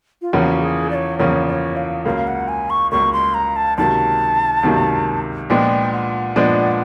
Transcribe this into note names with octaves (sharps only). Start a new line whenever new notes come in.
F4
E2 C#3 F3 A#3 C#4 F#4 G4
G#4
D5
C#5
E2 C#3 F3 A#3 C#4 C#5
D5
C#5
F5
C#2 C#3 F#3 A#3 F5
F#5
G#5
C#6
C#2 C#3 F#3 A#3 C#6
C6
A#5
A5
C#2 C3 D#3 F#3 A#3 A5
C#2 C3 D#3 F#3 A#3
A#2 F3 G#3 B3 D4 G5
F#5
A#2 F3 G#3 B3 D4